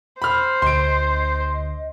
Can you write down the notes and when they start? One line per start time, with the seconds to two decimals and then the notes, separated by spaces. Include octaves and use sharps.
0.22 C5 B5 F6
0.62 D2 D#5 C6 D7